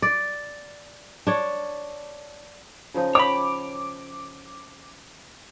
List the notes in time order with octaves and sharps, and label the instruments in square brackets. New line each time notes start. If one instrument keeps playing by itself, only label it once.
[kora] D5
D4 C#5
C#3 F3 D#4
[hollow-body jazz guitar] C#5 G5 B5 [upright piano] D6